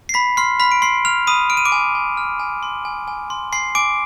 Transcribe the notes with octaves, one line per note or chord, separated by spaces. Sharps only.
C7
B5 B6
C6 F6 C7
B5 F6 B6
D7
B5 C6 C7
F6 F7
B5 D#6 D#7
F6 D7
D#7
D6 D7
G#5
G#5
F6
G#5
C6
G#5
G#5
C6
G#5 C6 C7
G#5 D6 D7